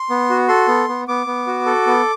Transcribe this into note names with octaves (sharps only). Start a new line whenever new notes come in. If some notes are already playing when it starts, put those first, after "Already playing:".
Already playing: C6
B3
F#4
A4 C6
B3
B3
B3 D6
B3
F#4
A4
B3